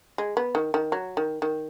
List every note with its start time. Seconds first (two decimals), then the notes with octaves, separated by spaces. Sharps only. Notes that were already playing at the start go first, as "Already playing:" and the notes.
0.18 G#3
0.37 B3
0.55 D#3
0.74 D#3
0.92 F#3
1.17 D#3
1.42 D#3